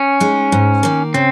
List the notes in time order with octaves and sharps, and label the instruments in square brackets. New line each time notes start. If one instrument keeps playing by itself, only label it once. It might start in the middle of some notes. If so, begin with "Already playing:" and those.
Already playing: [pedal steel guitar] C#4
[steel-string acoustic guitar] G#3 D#4
G#2
D#3 A#3
[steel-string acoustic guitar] C#3 [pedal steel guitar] C4